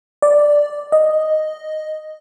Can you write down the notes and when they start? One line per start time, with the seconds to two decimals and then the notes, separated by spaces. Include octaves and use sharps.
0.22 D5
0.92 D#5